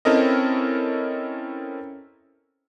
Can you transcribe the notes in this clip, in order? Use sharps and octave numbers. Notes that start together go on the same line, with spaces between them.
C4 C#4 E4 A4 A#4 D#5